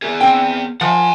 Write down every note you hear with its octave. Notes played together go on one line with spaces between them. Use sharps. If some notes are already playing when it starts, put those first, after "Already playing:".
B3 G#4
C4 G5
F3 F#5 G#5